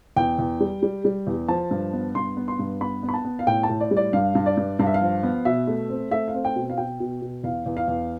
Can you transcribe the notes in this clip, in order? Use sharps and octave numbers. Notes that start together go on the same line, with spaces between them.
E2 G5
E2
G3
G3
G3
E2
F3 A5
G2
B3
G2 C6
B3
C6
G2
B3 B5
B3
B5
A5
B3
F5
A2 G5
A5
A2
D5
G3
D5
G2 F5
G2
D5
G2
G2 F5
E5
F5
F3
B3
B2 E5
A3
C4
A3 E5
F5
C4
G5
B2
F5
B2 G5
B2
B2
E2 F5
E2
F5
E2